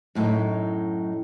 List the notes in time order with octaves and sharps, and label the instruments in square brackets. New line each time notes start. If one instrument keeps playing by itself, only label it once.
[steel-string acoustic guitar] F#2 A2 D3 F#3 D#4